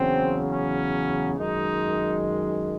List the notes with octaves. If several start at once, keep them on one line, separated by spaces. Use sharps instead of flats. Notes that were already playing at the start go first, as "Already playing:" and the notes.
Already playing: E2 C#3 F#3 C4
C#4
F#2 D#3 G#3 D#4